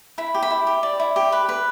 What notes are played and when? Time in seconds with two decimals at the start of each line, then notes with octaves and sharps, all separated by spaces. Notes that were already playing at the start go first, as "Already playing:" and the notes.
0.18 E4 B5
0.34 G4
0.42 B5
0.50 E4
0.67 G4
0.83 D5
1.00 E4
1.16 G4
1.32 B4
1.49 B4